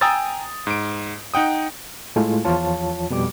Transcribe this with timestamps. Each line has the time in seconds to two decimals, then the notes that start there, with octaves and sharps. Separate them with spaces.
0.01 G5 G#5 A#5 D#6 E6 A6
0.67 G#2 D7
1.34 D#4 F#5 G5 D#6
2.16 A2 G#3 A3 E4 F4
2.45 E2 E3 F3 F4 C#5 A5
3.10 F2 B2 G3 D6